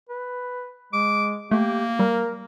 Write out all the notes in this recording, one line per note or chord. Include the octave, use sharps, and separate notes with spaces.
B4
G#3 D6
A3 A#3 G4
G3 A#4